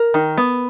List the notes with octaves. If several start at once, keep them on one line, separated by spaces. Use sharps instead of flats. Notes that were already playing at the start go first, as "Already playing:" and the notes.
Already playing: A#4
D#3
B3